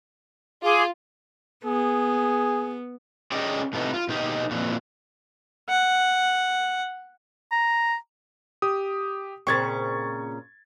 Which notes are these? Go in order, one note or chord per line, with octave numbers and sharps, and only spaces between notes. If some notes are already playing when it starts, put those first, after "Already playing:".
F4 G#4 D6
B3 G#4
C#4 G#4 D5 D#5 G5
A2 C3 B3 D#4
F4
B2 D#4 G4
F2 A#2 E3
F#5
A#5
G4 D#6
A#2 C#3 C4 C#6 G#6 A6